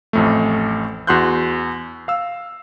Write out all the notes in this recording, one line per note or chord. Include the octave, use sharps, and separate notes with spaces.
A1 F2 A3
E2 F#4 C6 F#6 G6
F5 E6